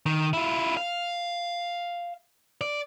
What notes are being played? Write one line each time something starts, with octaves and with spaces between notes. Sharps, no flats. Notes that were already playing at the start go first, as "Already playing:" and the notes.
D#3
E4 F4
F5
D5